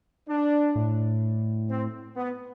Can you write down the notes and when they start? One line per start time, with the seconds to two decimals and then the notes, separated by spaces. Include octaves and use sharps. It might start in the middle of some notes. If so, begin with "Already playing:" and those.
0.28 D4
0.75 A2
1.69 C4
2.16 B3